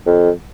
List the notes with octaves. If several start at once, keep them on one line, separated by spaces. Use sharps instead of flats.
F2